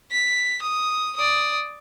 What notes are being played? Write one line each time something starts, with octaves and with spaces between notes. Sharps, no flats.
B6
D#6
D5 D#6